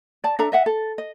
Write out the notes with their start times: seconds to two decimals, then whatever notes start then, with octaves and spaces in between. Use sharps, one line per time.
0.24 D5 A5
0.39 D4 A4 E5 A#5
0.52 D#5 E5 F#5
0.66 A4
0.98 D#5